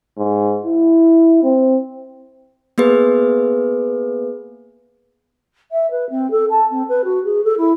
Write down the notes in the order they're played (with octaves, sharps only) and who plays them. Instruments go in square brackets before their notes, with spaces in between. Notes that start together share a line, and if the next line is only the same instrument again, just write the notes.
[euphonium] G#2
E4
C4
[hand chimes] A#3 B3 G#4 B4
[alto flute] E5
B4
C4
A4
A5
C4
B4
F#4
G#4
A4
E4